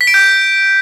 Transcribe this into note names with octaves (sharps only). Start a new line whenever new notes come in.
B6
D7
G6